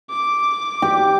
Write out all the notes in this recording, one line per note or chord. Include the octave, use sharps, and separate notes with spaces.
D6
G4